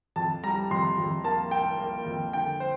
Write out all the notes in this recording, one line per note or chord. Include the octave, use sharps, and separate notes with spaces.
F2 A5
G3 A#5
F2 C6
F2
A#3 A5
A#3 G5
A#3
F2
D3 G5
C5